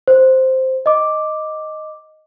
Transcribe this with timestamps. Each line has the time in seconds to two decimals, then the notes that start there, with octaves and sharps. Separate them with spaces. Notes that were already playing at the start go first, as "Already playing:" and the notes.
0.08 C5
0.86 D#5 D6